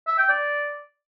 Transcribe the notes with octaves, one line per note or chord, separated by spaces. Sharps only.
E5
G5
D5